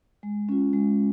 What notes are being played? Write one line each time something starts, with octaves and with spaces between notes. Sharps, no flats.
G#3
C#4 F4
G#3